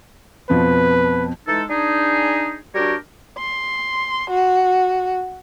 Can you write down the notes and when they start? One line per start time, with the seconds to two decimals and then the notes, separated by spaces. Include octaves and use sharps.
0.50 F2 B2 F3 B4
1.47 E3 G#3 D#4 A4
1.69 D4 D#4 G#4
2.75 G3 D4 F#4 G4 A#4 C#5
3.39 C6
4.30 F#4